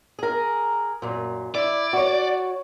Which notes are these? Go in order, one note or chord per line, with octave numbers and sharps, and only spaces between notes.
G#4 A#4
F#2 A#2
E4 D5
F#4 C#5